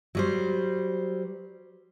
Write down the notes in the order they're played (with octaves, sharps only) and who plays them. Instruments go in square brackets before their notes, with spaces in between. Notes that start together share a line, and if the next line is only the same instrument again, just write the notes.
[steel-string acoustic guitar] F#3 G3 C5